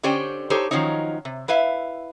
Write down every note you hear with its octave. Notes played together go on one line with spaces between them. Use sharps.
D3 C#4 G4 C5 D5 G5
D#4 G4 A4 C5 C#5
D#3 F3 F#3 C#4 D#4
C3
E4 B4 E5 F5